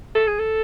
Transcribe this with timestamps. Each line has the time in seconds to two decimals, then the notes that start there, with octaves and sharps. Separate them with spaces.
0.15 A4
0.27 G#4
0.39 A4